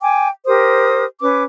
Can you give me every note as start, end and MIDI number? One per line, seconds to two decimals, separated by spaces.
0.01 0.28 79
0.01 0.28 80
0.01 0.28 86
0.46 1.04 67
0.46 1.04 70
0.46 1.04 72
0.46 1.04 87
1.21 1.43 61
1.21 1.43 71
1.21 1.43 86